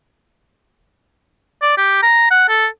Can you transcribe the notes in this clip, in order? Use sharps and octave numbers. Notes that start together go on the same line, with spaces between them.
D5
G4
A#5
F#5
A4